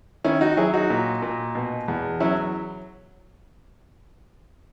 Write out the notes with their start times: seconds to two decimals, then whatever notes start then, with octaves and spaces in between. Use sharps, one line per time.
0.25 D#3 C#4 E4
0.41 D#4 F#4
0.57 F#3 E4 G#4
0.73 D#4 F#4
0.90 A#2
1.22 A#2
1.55 B2
1.88 E2
2.20 F#3 C#4 E4